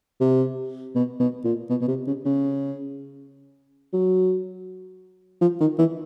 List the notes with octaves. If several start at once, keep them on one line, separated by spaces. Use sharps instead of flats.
C3
B2
B2
A#2
B2
B2
C3
C#3
C#3
F#3
F3
D#3
E3